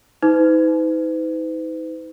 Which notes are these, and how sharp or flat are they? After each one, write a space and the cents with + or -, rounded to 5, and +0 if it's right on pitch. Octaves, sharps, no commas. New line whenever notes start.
D#4 +40 B4 +45